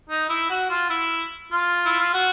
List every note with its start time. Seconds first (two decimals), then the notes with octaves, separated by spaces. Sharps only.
0.10 D#4
0.29 E4
0.50 F#4
0.71 F4
0.90 E4
1.52 F4
1.86 E4
2.00 F4
2.14 F#4